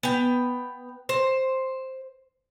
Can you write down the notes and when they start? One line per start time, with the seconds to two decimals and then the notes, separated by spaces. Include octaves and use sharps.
0.03 B3 G5
1.09 C5